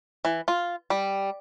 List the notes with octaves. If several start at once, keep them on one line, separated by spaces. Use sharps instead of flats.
E3
F4
G3